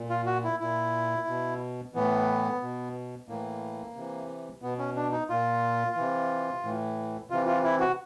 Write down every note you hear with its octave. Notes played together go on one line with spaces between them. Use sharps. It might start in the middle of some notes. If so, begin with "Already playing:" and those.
Already playing: A#2
F4
F#4
E4
A#2 E4
B2
A2 E3 B3
B2
A2 E3 A#3
C3 E3
B2 B3
C#4
D4
D#4
A#2 F4
C3 E3
A2 E3
C3 E3 F4
F4
E4
F#4